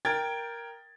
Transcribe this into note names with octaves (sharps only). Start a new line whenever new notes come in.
A#4 G5 G#6 A6